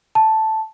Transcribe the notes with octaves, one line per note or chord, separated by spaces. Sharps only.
A5